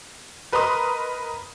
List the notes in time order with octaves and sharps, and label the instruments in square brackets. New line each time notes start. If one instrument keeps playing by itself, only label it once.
[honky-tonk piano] A#4 B4 D#5 A#5 C6 D#6